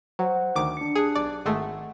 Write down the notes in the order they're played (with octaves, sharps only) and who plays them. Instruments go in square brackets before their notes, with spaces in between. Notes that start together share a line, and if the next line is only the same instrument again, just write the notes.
[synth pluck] F#3 [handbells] C5 F#5
[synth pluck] D2 D#3 D6
[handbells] D4 C#7
[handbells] G4 A5 F#6 [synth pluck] G#4
[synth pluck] B1 D5
[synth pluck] G#1 G#3 A3 [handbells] F#5